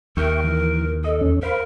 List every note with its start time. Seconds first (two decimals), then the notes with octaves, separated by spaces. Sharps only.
0.17 D#2 A#4 E5 G5 C#6
0.44 E3
1.04 A4 D#5
1.21 E2 C#4
1.43 A#4 C5 F5 B5